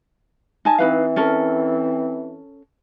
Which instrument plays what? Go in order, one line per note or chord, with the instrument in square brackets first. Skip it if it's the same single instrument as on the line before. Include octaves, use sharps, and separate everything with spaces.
[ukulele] D#4 G#5 A5
[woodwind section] E3 C4 [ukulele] D#4 B4 F5
[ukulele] C#4 A4 A#4